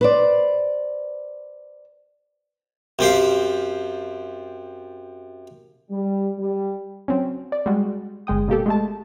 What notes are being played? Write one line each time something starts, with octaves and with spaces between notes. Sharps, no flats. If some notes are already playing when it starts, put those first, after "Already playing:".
B4 C5 D5
F#2 C4 G4 F5
G3
G3
F#3 C4 C#4
D5
G3 G#3 F#4
G1 G#3 G5 D#6
B2 A#3 G4 A4
G#3 A3 A5